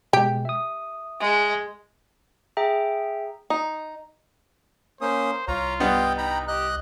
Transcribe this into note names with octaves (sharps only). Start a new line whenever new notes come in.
B2 G#3 G4
E5 D#6
G#3
G#4 E5 G5 A#5
D#4
A#3 C#4 C5 D#6
C2 F4 C#5 A#5
G2 B3 D#5 G5
D#4 G5 A#5 B5
G4 D#5 F#6